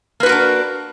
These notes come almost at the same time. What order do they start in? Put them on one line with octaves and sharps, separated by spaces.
A#3 B4 F#4 A#4 D4